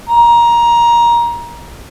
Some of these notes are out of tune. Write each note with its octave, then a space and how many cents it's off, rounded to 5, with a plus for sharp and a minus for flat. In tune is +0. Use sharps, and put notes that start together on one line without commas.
A#5 +20